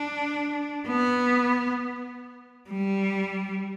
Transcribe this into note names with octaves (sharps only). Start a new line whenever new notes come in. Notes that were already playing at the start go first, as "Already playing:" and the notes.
Already playing: D4
B3
G3